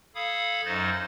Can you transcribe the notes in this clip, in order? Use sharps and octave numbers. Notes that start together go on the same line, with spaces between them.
A4 F5 B5 D#6 G#6
F#2 F#3 D#4 C5 D#5 A6